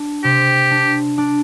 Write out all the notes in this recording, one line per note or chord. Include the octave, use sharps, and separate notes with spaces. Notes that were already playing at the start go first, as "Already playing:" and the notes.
Already playing: D4
C3 G4
D4
D4